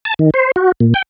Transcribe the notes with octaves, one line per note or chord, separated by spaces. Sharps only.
A5
D#3
C5
F#4
A#2
G5